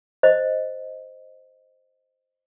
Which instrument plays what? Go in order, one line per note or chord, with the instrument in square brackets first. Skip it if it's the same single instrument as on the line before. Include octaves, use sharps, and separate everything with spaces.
[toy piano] C5 D#5